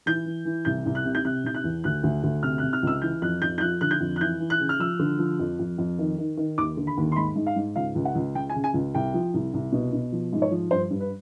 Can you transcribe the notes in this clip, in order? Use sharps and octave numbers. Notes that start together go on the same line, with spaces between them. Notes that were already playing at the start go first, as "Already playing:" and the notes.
E3 G6
E3
E3
C2 G6
C2
F#6
C3
G6
C3 F#6
C3 G6
F#6
E2
D2 F#6
D2
D2
C3 F6
F#6
C3
F6
C#2 E6
E3 G6
F2 F#6
F2 G6
G6
F3 F#6
D3 F#6
G6
F2
F#6
E3 G6
E3
F#6
C#3
F6
F3 E6
D3
F3
F2
F2
F2
D#3
D#3
D#3
D#2 D6
D3
B5
D#2
C6
G#2 B5
G#2
F5
G#2
C#2 F5
C#2
F#5
C#2
C#3 G5
G#5
C#3
G#5
C#2
C2 G5
F3
C2
C2
B2
B2
F3
G#2
C#5
F3
G2 C5
G2
B4